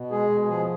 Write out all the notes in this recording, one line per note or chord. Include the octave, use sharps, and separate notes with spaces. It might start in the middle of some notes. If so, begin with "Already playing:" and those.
Already playing: B2
G#3 G#4
B2
F3 G#4